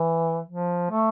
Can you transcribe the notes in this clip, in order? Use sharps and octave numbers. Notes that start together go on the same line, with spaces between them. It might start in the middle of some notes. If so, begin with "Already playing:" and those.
Already playing: E3
F3
A3